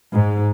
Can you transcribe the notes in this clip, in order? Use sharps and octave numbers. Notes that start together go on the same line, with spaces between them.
G#2